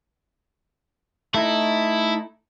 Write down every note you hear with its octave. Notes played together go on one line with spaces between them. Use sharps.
A3 D#4 E4